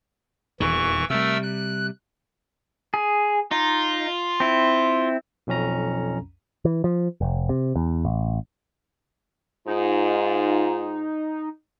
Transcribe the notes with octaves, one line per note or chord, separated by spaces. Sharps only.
D#1 E2 D#3 E3 C#6
C3 G3 A3 A#4 E6
F#6
G#4
D#4 F4
C4 E4
B1 F2 C#4 A#5
E3
F3
F1
C3
E2
A1
G#2 D#4 F4